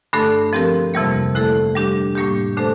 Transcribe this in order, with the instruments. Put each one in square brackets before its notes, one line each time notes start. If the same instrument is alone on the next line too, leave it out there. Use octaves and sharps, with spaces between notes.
[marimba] G2 D3 A3 D4 A4
F3 C4 G4 A#4
F2 C3 E3 G3 A#3
D3 A3 E4 A4
G3 D4 G4
A2 G3 A#3 D4 G4
D3 A3 D4 A4 C5